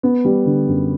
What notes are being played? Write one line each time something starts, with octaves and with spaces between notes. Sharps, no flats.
B3
G3
D3
F#2